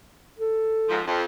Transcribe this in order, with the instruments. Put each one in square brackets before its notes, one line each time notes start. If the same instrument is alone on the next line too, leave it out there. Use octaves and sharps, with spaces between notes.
[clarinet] A4
[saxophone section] G#2 F3
F2